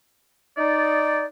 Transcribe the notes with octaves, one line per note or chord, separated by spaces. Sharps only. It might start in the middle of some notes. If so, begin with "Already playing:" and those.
D#4 D5